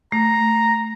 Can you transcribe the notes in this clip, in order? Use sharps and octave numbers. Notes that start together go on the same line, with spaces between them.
A3 A#5